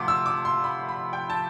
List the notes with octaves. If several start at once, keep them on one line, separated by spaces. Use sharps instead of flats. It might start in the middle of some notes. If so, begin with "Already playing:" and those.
Already playing: D2 C3 F3 C6 D6
E6
D6
C6
B5
B5
G5
A5